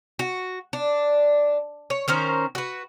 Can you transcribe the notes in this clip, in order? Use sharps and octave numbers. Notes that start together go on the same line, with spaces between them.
F#4
D4
C#5
D#3 C#4 A#4 C5
F#4 B4